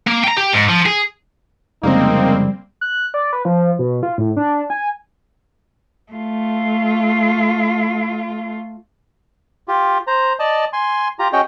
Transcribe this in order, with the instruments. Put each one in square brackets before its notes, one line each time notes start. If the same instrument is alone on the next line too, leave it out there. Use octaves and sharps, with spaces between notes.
[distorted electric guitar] A#3
G5 A#5
G4
G#2
F3
G#4
[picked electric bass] F1 C#3 G#3 [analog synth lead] G3 [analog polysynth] A#3 C4 [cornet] D#4
[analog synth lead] F#6
D5
B4
F3
B2
F4
A2
D4
G#5
[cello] A3 F4
[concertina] F4 G4
C5 A#5
D5 D#5 A5
G#5 C6
F4 G4 A#5
C#4 F#4 G#4 C#5 D#5 G5